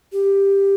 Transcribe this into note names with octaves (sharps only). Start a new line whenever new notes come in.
G4